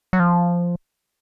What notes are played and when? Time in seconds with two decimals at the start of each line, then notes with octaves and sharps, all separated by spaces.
0.13 F#3
0.20 F3